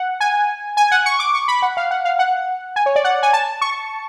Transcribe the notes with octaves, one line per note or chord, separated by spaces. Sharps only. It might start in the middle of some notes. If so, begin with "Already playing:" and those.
Already playing: F#5
G#5
G#5
F#5
C#6
D6
C#6
B5
F#5
F5
F#5
F5
F#5
G#5
C#5
D5
F#5
G#5
A5
C#6